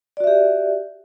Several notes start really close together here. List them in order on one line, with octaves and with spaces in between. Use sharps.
D5 F#4 E5 G4